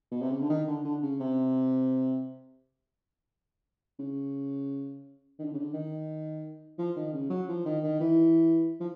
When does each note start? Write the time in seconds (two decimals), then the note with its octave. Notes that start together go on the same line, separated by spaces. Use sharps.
0.11 B2
0.22 C3
0.31 C#3
0.40 D3
0.49 D#3
0.67 D3
0.84 D3
1.02 C#3
1.20 C3
3.99 C#3
5.39 D#3
5.45 D3
5.53 C#3
5.59 D3
5.74 D#3
6.78 F3
6.96 D#3
7.13 C#3
7.30 F#3
7.48 F3
7.65 D#3
7.83 D#3
8.00 E3
8.80 F3